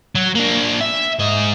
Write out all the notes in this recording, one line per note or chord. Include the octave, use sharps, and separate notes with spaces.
F#3
A#3 D4
E5
G#2 D#5